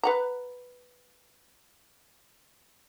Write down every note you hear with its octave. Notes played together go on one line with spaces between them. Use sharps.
B4 F#5 A#5